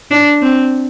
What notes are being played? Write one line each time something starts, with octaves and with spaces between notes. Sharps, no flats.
D4
C4